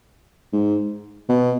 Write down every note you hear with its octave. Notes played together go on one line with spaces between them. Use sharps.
G#2
B2